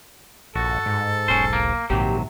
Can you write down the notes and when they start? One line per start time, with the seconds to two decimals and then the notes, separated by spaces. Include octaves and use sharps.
0.56 A#1 G2 F#4 A4
0.86 G#2
1.28 E1 B1 C#4 C5
1.53 A#3
1.90 A#1 D#2 G#2 C3 F#3 G4